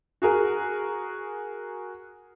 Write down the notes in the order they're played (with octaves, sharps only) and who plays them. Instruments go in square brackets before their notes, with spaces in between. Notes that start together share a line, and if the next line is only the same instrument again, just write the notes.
[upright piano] F#4 G#4 A#4